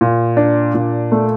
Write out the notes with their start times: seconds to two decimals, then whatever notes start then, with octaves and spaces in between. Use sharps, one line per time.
0.01 A#2
0.37 D4
0.74 A#2
1.12 A3